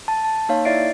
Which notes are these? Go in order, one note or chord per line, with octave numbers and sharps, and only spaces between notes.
A5
A5
A#3 D#4 C#5 F5
E4 D5 E5 A6 C7 D7